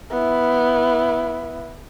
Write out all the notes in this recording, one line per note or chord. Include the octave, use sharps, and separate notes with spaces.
B3 E4